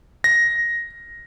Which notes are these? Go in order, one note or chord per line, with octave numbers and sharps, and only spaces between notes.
A#6